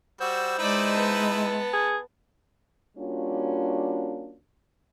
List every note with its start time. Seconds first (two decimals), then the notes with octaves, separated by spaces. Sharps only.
0.21 G3 F#4 C5 E6
0.59 G#3 D#4 E4 B4 D5 B5
0.92 B3 A5
1.73 G#4
2.98 G3 A#3 C#4 D4 F4 F#4